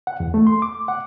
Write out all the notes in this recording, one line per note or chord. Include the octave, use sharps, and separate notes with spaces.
F#5
E2
A3
C6
D6
F#5